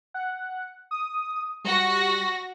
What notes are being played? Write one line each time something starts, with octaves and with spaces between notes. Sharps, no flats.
F#5
D#6
G3 F#4 A#6